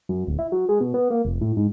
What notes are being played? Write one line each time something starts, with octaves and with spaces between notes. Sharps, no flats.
F#2
D1
E4
F#3
G#3
B2
B3
A#3
F1
A2
G#2